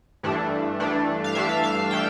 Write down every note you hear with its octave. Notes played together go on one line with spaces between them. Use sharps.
G2 E3 A3 D4
G2 E3 A3 D4
F5
G2 E3 A3 D4 E5
F5
F5
E3 A3 G5